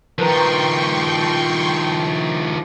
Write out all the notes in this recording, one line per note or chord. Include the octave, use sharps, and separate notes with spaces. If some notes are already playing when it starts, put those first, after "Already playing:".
D#3 F3 A#4 B4 G5 A#5 C6 C#6